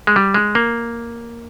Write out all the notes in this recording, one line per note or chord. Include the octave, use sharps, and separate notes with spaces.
G#3
G3
G#3
A#3